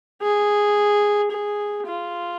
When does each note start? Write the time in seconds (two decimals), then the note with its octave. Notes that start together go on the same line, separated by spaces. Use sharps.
0.22 G#4
1.31 G#4
1.87 F4